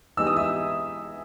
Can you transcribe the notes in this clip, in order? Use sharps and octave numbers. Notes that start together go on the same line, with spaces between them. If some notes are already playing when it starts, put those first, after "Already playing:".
E3 G#3 B3 D#4 G4 E6
D#6
E5 E6